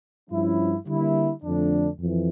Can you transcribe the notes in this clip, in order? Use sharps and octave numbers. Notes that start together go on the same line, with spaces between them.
G2 F3 C#4 E4
D3 G3 A#3 E4
F2 D3 A3 D4
F2 E3